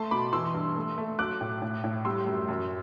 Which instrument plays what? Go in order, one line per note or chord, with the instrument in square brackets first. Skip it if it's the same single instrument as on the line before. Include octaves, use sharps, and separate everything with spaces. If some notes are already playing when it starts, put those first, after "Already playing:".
Already playing: [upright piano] A3 A5 C6
B2 B5 D6
E3 C6 E6
G2
A3
A3
F#3 D6 F#6
A2
A2
A2
G3 C6 E6
F#2
F#2